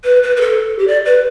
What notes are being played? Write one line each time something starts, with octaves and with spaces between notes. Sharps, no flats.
B4
B4
B4
A4
G4
D5
B4